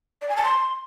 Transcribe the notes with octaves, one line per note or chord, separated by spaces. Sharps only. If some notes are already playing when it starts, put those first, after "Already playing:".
D5
G#5
A5
C6